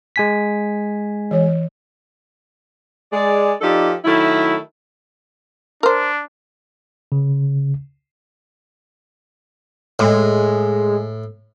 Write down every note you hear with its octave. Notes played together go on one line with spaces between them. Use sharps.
G#3 G#5 B6
E3 C#5
G#3 D5
F3 D#4 G4 A4 D5
D#3 F#3 A3 E4
D4 A#4 C5
C#3
A2 G#3